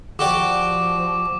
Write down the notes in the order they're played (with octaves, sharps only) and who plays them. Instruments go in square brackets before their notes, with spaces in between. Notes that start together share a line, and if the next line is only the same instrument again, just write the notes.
[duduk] F3 [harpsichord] F#4 G4 D5 [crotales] D6